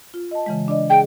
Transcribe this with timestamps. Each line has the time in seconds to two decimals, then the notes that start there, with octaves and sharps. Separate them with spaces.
0.14 F4
0.31 D#5 A5
0.46 C#3 E3 G#3
0.68 D4 D5 D#5
0.90 G#4 G5